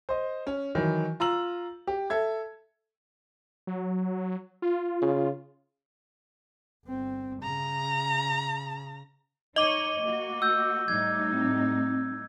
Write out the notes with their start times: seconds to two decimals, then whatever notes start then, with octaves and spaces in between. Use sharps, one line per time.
0.09 C5 D#5
0.47 C#4
0.75 D#3 E3 F#3
1.20 F4 A#5 E6 F#7
1.87 G4
2.10 A4 E5 G#6
3.67 F#3
4.62 F4
5.02 C#3
6.86 G1 C4
7.43 C#3 A#5
9.56 D#4 C#5 D#5 D6 D#7 G7
10.02 A#3 F#4
10.42 E6 G6
10.88 A2 G3 D#4 G#6
11.33 C4